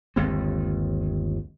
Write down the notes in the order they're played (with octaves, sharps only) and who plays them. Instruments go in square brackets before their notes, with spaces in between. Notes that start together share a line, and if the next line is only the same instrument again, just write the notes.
[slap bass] G1 D#2 G#3 C4